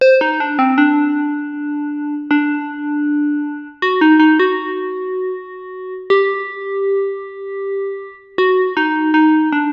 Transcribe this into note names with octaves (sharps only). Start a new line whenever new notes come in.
C5
D#4
D4
C4
D4
D4
F#4
D#4
D#4
F#4
G4
F#4
D#4
D#4
D4